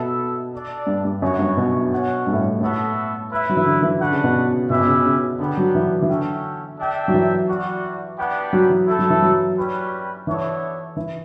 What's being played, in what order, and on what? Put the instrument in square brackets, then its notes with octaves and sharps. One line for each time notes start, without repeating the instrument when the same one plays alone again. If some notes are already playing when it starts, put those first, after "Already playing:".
Already playing: [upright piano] B2 [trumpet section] B3 E4 A4 E5
[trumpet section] D4 A4 D5
[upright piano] G2
G2
[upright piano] F#2 [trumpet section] B3 F#4 C#5
[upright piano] G2
B2
[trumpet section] C#4 F#4 C#5 F#5
[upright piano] G2
A2
G2
[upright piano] A2 [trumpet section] B3 F#4 A4 E5
[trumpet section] E4 B4 E5
[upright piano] F#3
E3
D3
E3
[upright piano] D3 [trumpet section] D4 F#4 B4 F#5
[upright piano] C#3
B2
C#3
[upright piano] B2 [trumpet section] C#4 G4 B4 E5
[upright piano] B2
C#3
C#3
[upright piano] D3 [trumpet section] B3 D4 G4 B4
[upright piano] F#3
E3
E3
[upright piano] D3 [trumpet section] C#4 F#4 A4 E5 G5
[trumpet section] D4 A4 E5 G5
[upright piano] F#3
E3
[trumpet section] G3 D4 F#4
B3 D4 G4 B4 F#5
[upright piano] F#3
E3
[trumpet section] A3 E4 A4
[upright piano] F#3
E3
F#3
[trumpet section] G3 C#4 G4 B4
[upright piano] E3 [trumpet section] B3 D4 A4 C#5 E5
[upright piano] E3